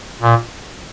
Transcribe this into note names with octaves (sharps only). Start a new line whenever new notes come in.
A#2